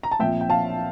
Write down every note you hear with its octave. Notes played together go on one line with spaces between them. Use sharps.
A#5
A5
A#2 F3 C4 E5 G5
G5
F5 A5